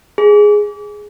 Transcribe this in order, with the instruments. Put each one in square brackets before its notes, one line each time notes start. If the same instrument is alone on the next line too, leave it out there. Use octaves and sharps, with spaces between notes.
[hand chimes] G#4